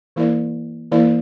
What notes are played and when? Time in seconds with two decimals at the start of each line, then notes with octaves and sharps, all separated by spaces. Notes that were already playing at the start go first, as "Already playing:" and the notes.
0.16 E3 A#3 E4 A#4 D5
0.91 E3 A#3 E4 A#4 D5